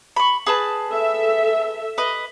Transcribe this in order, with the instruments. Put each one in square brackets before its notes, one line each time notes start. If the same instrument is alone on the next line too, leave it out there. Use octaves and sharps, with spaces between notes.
[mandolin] B5 C#6
G#4 B4 A5
[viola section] A4 E5
[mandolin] B4 D#5